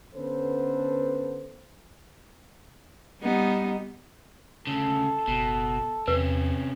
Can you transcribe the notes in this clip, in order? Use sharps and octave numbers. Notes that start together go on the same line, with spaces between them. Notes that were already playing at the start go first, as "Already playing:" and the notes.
D3 B3 C#4 A4 B4 C5
G3 B3 D#4
D2 C#3 A4
F#1 B2
E2 C3 C#4 B4